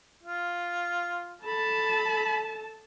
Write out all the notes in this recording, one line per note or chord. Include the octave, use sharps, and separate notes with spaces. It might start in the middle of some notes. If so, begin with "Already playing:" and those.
F4
A4 A5 B5